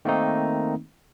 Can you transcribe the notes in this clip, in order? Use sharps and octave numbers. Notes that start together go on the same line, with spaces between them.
D#3 A3 A#3 C4 D#4